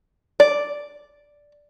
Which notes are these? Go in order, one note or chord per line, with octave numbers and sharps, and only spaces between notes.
D5